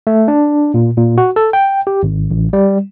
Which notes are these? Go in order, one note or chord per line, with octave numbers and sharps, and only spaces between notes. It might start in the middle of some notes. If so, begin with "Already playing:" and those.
A3
D4
A#2
A#2
F#4
A4
G5
G4
G#1
A1
G3